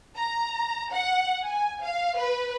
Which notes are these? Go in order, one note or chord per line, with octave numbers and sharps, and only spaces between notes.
A#5
F#5
G#5
F5
B4